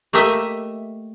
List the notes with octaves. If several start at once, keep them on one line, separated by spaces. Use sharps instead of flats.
A3 A#3 G4 A#4 D#5 E5